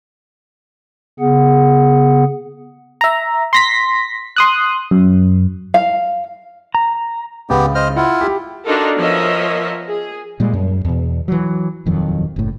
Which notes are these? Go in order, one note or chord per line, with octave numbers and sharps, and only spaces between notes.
C#3 B3 G#4 F#5
E5 A#5
C6 A#6 B6
C6 D#6 F#6
F#2
F5
A#5
C#2 B3 G4
C5 D#5 F6
E4 F4 F#5
G4
D4 D#4 F4 F#4 A4 A#4
F3 B3 A#4 C#5 D#5 E5
G#4
A#2 G3 G#3
F#2
E2 B2
E3 F#3
D#1 F2 D#3 F#3
F#1 A2